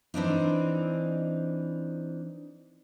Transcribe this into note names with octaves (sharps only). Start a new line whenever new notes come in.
E3 C4 D4 D#4